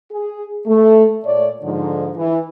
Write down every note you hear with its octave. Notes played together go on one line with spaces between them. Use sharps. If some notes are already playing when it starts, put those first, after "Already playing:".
G#4
A3
A#2 A3 C#5 D5
G#2 D3 F3
E3